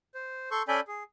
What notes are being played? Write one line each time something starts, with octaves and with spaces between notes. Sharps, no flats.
C5
A4 C6 C#6 G6
C#4 A4 D5 G#5 B5 G6
G#4